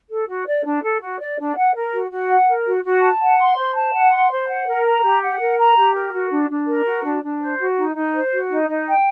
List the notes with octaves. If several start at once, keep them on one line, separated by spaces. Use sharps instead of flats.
A4
F#4
D5
D4
A4
F#4
D5
D4
F#5
A#4
F#4
F#4
F#5
A#4
F#4
F#4
A5
F#5
C6
C5
A5
F#5
C6
C5
F#5
A#4
A#5
G4
F#5
A#4
A#5
G4
A#4
F#4
D4
D4
A#4
F#4
D4
D4
C5
F#4
D#4
D#4
C5
F#4
D#4
D#4
G5